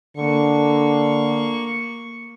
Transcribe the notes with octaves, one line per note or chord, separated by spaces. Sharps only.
D3 A#3 C#6